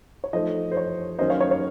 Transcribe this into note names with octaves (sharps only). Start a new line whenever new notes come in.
C#5
F3 A3 D#4 C5 D#5
C5
C#5
D#3 F#3 A#3 C#4 C5 D#5
C#5 F5
C#5
C#5